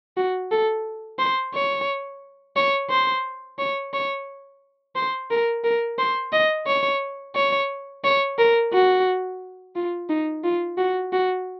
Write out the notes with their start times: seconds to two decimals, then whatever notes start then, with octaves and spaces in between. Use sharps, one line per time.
0.17 F#4
0.51 A4
1.19 C5
1.54 C#5
2.56 C#5
2.90 C5
3.59 C#5
3.94 C#5
4.96 C5
5.30 A#4
5.64 A#4
5.99 C5
6.32 D#5
6.67 C#5
7.35 C#5
8.04 C#5
8.38 A#4
8.73 F#4
9.76 F4
10.09 D#4
10.44 F4
10.78 F#4
11.13 F#4